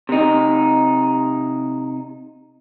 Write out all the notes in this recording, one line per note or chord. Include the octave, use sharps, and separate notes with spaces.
C3 D#4